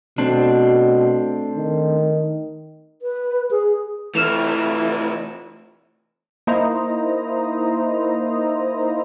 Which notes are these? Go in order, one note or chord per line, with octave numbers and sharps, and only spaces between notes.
B2 A3 C4 D4
D#3
B4
G#4
C3 E3 A3 F6 E7 F7
A#3 D#4 E4 C5 D#5 A#5